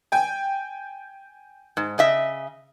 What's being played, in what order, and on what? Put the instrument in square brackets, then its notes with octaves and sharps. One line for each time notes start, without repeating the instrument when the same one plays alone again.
[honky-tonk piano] G5 G#5
[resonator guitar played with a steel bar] G#2
C#3 D#5 E5